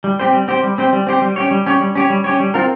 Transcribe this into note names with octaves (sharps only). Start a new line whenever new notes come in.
G3
C4 G4 C5
G3
C4 G4 C5
G3
C4 G4 C5
G3
C4 G4 C5
G3
C#4 G4 C#5
G3
C#4 G4 C#5
G3
C#4 G4 C#5
G3
C#4 G4 C#5
G3
C4 F4 A#4